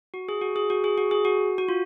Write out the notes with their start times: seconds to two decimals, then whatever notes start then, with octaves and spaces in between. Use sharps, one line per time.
0.14 F#4
0.29 G#4
0.42 F#4
0.56 G#4
0.70 F#4
0.84 G#4
0.98 F#4
1.11 G#4
1.25 F#4
1.58 F#4
1.69 F4